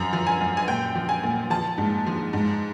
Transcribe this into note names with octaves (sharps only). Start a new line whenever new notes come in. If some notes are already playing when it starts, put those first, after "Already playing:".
Already playing: F#2 F3 A#5
F3
G#5
F#2
G#5
A#2 G5
F3
G#5
A#2
F3 A5
G#2
F3
G#2